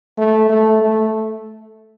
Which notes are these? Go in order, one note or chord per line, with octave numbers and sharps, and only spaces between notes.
A3
A3
A3